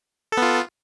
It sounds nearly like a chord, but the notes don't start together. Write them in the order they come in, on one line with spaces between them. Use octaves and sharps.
A4 B3 F4